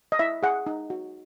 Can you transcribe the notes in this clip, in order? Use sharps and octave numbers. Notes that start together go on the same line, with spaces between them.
D#5
E4 E5
G#4 F#5
D#4
F#4